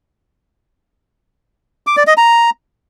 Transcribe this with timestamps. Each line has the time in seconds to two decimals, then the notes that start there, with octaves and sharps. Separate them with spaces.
1.87 D6
1.97 D5
2.07 D#5
2.17 A#5